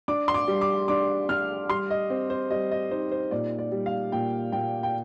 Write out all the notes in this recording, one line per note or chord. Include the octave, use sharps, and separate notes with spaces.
D4 D6
C6
D6
G3
D6
D4 D6
D4 F6
G3 C6
D#5
C4
C5
G3 D#5
D#5
D#4 C5
C5
A#2 D5
D5
G3
F5
A#2 G5
A#2 G5
G5